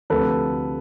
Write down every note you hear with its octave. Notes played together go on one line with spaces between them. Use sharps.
D2 C3 F3 A4 B4